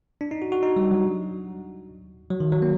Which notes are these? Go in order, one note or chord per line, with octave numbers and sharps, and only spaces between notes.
D4
D#4
F#4
F#4
D#4
G3
F#3
F#3
D#3
F#3
A#3